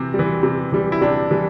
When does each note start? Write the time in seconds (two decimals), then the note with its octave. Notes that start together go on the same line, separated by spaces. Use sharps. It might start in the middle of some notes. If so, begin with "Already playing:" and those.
Already playing: C3 E3 C4
0.14 G3
0.19 E3
0.43 C3
0.72 E3 G3
0.92 E4
1.01 C3 D4
1.31 E3 G3